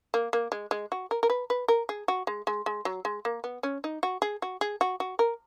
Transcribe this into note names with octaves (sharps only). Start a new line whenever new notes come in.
A#3
A#3
G#3
G#3
F#4
A#4
A#4
B4
B4
A#4
G#4
F#4
G#3
G#3
G#3
F#3
G#3
A#3
B3
C#4
D#4
F#4
G#4
F#4
G#4
F#4
F#4
A#4